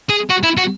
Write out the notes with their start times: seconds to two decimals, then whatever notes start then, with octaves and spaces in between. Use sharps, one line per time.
0.09 G#4
0.30 F#4
0.43 E4
0.57 F#4